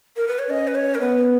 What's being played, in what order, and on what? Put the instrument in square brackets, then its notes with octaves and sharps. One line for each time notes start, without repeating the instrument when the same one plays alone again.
[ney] A#4
B4
C#5
[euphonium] C#4 [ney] D#5
[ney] B4
C#5
A#4
[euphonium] B3 [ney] B4